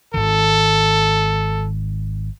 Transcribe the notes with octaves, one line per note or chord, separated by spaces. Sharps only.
G#1 D#3 A4